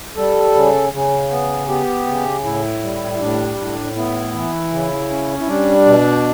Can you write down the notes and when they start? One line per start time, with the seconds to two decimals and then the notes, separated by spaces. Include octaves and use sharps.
0.17 G3 A4
0.55 C#3
0.93 C#3
1.31 B3
1.69 B3 G4
2.07 C#3
2.44 A2 E4
2.82 G3
3.12 E4
3.20 A2 D4
3.58 A2
3.96 B3 E4
4.34 E3
4.72 C#3
5.10 C#4
5.40 E4
5.47 G3 D4
5.86 B2